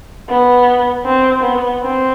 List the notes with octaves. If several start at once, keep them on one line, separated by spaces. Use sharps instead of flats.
B3
C4
B3
C4